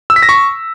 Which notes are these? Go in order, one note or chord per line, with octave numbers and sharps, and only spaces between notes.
E6
B6
A#6
C#6